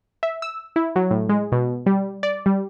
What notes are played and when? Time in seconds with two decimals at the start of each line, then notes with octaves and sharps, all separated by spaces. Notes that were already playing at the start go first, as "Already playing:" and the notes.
0.23 E5
0.42 E6
0.76 E4
0.96 F#3
1.11 A2
1.29 G#3
1.52 B2
1.86 G3
2.23 D5
2.46 G3